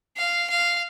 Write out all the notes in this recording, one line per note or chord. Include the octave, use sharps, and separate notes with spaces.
F5
F5